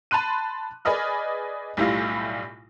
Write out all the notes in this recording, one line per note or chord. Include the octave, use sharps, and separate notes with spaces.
A5 B5 C6 F#6 D#7
G#4 B4 D5 D#5 F6
B1 A2 G3 E4 F4 A#6